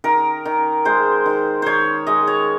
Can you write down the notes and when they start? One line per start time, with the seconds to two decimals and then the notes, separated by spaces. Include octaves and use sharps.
0.04 D#3 A#4
0.45 D#3
0.85 G#3 C5
1.26 D#3
1.62 D#3 C5 C#5
2.07 G#3 D#5
2.27 C#5